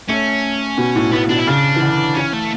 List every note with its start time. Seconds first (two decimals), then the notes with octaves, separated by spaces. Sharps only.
0.09 A3 C#4
0.78 B2
0.96 A2
1.13 A2 B3
1.30 B2 D4
1.38 E4
1.47 C#3 D4
1.76 E3
1.82 D3
2.16 E3 C#4
2.33 A3